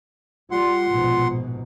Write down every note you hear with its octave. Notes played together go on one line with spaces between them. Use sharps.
G3 F4 F#5 C6
A#1 G#2 B2